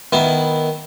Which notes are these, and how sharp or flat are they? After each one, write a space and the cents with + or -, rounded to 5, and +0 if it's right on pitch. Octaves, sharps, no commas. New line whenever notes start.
D#3 +0 B3 -5 E4 -10